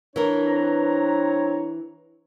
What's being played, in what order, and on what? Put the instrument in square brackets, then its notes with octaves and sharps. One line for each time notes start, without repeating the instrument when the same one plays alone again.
[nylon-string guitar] E3 A#4 [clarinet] D4 [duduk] C#5
[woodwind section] C4 B4 A#5